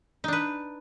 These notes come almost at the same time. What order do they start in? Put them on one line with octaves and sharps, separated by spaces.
D#4 D4 B4